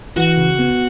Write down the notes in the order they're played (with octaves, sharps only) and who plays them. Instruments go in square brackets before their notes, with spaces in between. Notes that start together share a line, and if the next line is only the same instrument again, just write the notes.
[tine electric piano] E3 [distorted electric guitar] F#4
[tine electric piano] C#3
B3